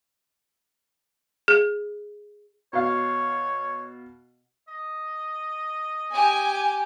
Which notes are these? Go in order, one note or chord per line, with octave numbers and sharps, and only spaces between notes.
G#4
B2 C#5 F5
D#5
G4 G#5